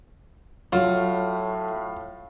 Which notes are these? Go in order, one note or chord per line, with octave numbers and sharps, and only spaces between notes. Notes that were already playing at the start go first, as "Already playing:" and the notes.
A2 F#3 F4 F5